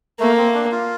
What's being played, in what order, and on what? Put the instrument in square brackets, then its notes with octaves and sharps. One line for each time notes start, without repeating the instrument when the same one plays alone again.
[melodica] A3 [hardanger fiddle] A#3
[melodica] C4
D4
F4